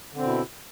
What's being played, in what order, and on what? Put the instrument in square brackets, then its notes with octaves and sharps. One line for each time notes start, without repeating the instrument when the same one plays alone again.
[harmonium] D3
C4
B2
E4